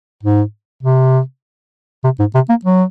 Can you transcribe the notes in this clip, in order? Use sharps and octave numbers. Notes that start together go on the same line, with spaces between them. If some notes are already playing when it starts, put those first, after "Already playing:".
G#2
C3
C3
G#2
C3
A#3
F#3